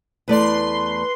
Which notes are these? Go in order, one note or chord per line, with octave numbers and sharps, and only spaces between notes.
E2 A3 B4 D5 C6